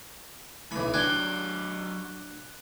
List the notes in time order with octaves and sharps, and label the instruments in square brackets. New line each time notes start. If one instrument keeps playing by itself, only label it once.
[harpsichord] B1 B5 [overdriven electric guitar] E3
[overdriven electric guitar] F#3 D5 [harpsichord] D4 G5 G#5 [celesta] F#6 G7